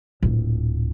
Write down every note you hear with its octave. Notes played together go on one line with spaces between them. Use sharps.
D1 A#2